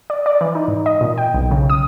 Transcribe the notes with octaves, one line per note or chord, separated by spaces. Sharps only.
D5
D5
E3
D#4
G#2
D#5
A#2
G5
B1
C#3
D#6